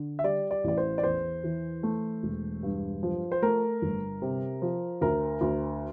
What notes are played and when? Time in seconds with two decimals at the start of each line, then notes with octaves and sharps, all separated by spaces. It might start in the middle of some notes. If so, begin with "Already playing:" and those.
Already playing: D3
0.19 E5
0.24 G3 D5
0.51 D5
0.64 A1 D5
0.77 C5
0.98 D5
1.03 E2 C5
1.44 E3
1.83 A3
2.23 E1
2.63 G2
3.03 F3
3.32 C5
3.42 A3 A#4
3.82 G1
4.22 C3
4.62 F3
5.01 D2 A#4
5.41 D2